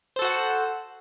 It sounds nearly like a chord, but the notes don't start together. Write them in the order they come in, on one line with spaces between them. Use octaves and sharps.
C5 A4 F#4 F#5